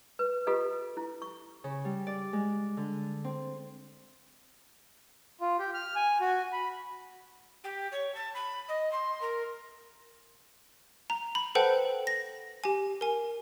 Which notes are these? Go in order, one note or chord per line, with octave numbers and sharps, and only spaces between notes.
B4
F4 G4 A4 B4 D#5
E4
C#6
C#3
G3
D5
G#3
D3
C4
F4
G4
F6
G#5
F#4
B5
G4
C#5
A5
B5
D#5
C6
A#4
A#5
B5
A4 B4 C5 F#5 G5 A5
A#6
G4 G#5
A#4 G#5